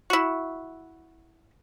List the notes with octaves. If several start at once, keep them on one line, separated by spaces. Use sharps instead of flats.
E4 F#4